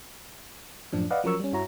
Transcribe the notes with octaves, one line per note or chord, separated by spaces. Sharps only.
F#2 A2 F3 D4
B4 D5 D#5 F5 F#5
F3 F#3 C#4 A#4 C#6 E6
G3 C#4
G2 E4 F#4 C#5 A#5